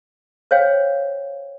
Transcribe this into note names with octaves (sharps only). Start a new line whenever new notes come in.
C5 C#5 F5 G5